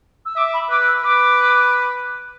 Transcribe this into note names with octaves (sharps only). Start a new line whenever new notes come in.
E6
E5 D6
B5
B4 D6
E6
B4 D6